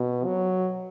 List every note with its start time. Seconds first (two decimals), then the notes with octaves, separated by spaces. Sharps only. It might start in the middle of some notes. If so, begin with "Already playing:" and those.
Already playing: B2
0.25 F#3